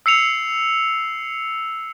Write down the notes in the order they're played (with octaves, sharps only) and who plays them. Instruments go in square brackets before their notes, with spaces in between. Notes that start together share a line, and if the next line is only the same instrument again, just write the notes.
[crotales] E6 C7 C#7 F7